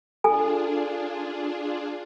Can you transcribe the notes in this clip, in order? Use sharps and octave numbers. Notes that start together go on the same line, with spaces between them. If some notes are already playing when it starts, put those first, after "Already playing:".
D4 F4 G#4 A4 G#5